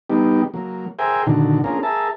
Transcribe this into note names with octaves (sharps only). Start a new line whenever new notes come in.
G3 B3 D#4 G4
F#3 A#3
G#4 A#4 C5 E5 G5 G#5
A#2 D3 D#3 D4 F#4
A#3 C#4 D4 F4 G#4 A#4
G#4 A#4 E5 A5